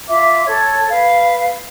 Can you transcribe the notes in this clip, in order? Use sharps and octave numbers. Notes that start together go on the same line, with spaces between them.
F4 E5 D6
A4 C#5
B4 F5